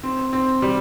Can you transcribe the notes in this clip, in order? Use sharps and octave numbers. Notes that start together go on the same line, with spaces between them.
C4
C4
G3